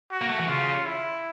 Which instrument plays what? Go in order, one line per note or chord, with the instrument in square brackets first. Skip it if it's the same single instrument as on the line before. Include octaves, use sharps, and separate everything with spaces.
[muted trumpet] F#4
[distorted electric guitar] A#3
A3
E3
[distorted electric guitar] C#3 [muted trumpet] F4
[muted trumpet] E4